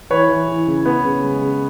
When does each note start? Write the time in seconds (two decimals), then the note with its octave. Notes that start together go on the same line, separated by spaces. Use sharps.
0.10 E3 B4 C#5
0.29 E3
0.48 E3
0.67 C#3
0.86 B3
1.04 C#3
1.23 G#3
1.42 C#3